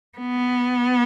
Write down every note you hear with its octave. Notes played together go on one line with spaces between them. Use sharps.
B3